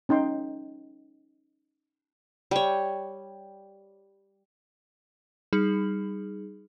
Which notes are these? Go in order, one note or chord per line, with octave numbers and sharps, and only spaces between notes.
C#4 D#4 G5 C6
G3 C#5
G3 D#4 G#4